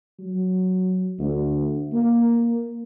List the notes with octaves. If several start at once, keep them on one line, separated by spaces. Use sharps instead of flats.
F#3
D2
A#3